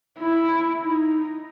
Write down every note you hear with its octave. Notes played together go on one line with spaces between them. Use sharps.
E4
D#4